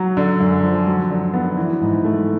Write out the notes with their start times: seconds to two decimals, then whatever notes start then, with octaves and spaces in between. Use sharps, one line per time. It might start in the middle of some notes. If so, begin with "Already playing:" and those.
Already playing: F#3
0.17 D3
0.40 F#2
0.63 F3
0.87 F#3
1.10 D3
1.34 B3
1.57 E3
1.81 G#2
2.05 A3